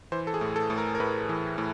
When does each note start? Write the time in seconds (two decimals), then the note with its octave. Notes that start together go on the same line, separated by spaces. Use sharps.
0.12 E3 C5
0.27 A4
0.34 G#4
0.41 A2
0.56 A4
0.70 A2
0.78 A#4
0.95 A#4
1.00 A2 B4
1.29 E3
1.58 A2